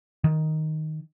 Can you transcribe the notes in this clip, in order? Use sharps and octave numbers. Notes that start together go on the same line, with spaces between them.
D#3